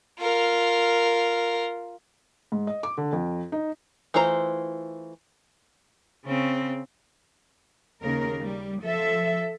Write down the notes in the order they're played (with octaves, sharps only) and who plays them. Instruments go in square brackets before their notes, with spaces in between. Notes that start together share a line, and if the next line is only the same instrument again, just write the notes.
[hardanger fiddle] F4 A#4
[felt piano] G#2
D#5
D6
D3
F2
D#4
[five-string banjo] E3 A3 F4 C5 A#5
[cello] C#3 C4
[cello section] D#2 C#3 A#4
G3
F3 A4 E5